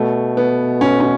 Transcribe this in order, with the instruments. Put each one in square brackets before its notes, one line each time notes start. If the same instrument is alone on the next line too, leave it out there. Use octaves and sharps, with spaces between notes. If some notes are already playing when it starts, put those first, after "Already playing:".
Already playing: [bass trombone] B2 [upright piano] A3
[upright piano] B3
C#4
C#4